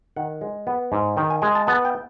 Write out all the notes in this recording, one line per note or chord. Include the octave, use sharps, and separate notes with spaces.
D#3 F#5
G#3
B3
G#2
D#3 G5
G#5
G#3 G#5
A5
B3 A5
G5